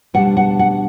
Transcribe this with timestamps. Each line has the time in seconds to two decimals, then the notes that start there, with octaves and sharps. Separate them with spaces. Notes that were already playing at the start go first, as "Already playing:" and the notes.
0.14 B2 G3 D4 F#5
0.37 F#5
0.59 F#5